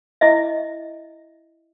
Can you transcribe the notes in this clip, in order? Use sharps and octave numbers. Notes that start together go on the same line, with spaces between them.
E4 D#5 E5